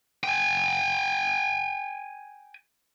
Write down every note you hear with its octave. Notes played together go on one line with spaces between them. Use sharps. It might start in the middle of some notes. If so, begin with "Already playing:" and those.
G5 G#5